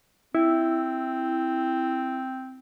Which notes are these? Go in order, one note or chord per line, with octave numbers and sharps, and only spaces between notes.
C4 E4